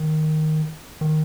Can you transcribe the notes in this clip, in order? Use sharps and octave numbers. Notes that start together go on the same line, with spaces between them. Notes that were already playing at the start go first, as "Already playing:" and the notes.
Already playing: D#3
D#3